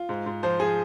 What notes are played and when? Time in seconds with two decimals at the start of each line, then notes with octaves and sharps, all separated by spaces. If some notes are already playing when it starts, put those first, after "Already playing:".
Already playing: F4
0.09 G#2
0.26 G#2
0.43 F3 C5
0.60 F3 G#4